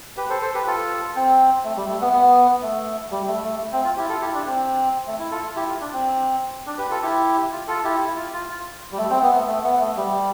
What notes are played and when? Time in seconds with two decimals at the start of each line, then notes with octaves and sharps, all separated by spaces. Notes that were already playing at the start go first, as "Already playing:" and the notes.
0.17 G4 B4
0.30 A4 C5
0.42 A4 C5
0.54 G4 B4
0.67 F4 A4
1.16 C4
1.64 A3
1.77 G3
1.89 A3
2.01 B3
2.13 B3
2.62 A3
3.11 G3
3.27 A3
3.44 A3
3.60 A3
3.73 C4
3.84 F4
3.97 E4 G4
4.09 F4 A4
4.21 E4 G4
4.34 D4
4.46 C4
5.07 A3
5.19 E4
5.31 F4 A4
5.56 E4 G4
5.68 F4
5.81 D4
5.93 C4
6.66 D4
6.78 G4 B4
6.90 F4 A4
7.02 E4 G4
7.52 F4
7.68 F4 A4
7.84 E4 G4
8.00 E4
8.17 F4
8.33 F4
8.92 G3
8.98 A3
9.10 C4
9.22 B3
9.35 A3
9.47 A3
9.64 B3
9.80 A3
9.97 G3